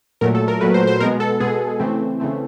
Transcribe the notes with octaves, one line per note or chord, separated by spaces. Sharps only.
A#2 F#3 A3 A#4
A4
A#4
A#2 F#3 A3 B4
C5
C5
B2 G#3 B3 A#4
A4
B2 G#3 B3 G#4
C#3 E3 A3 C4
C#3 E3 A3 C4